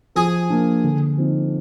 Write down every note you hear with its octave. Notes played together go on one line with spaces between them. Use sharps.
F3 G#4
A#3 D4
D3
F3 C4 D#4